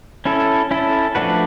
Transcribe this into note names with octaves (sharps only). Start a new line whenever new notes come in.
C#4 E4 A4
C#4 E4 A4
F3 A3 D4 F#4 B4